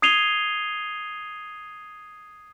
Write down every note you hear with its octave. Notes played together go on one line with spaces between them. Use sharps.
D#6 G#6 C7 D#7 F7 G7